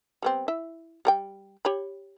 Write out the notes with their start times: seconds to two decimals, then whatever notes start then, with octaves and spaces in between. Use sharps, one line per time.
0.22 G3 B3 C4
0.48 E4 E5
1.05 G3 A#4 G5
1.65 G4 C#5 B5